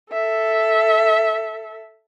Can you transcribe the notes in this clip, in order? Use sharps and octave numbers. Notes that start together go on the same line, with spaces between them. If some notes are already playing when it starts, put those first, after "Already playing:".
A4 E5